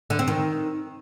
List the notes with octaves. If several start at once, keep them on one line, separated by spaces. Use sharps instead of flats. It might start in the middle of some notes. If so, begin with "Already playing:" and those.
D3
C4
D#3